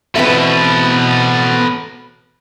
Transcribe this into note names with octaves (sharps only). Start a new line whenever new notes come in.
B2 E3 C4 A4 B4 E5